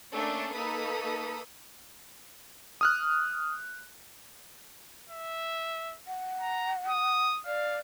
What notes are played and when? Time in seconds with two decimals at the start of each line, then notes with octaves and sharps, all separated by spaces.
0.11 A3 A#3 C#4 D4 A4
0.55 A#3 D#4 A4 B4 D#6 B6
2.81 D#6 F6 F#6
5.10 E5
6.07 F#5
6.41 A#5
6.89 D#6
7.46 D5 F5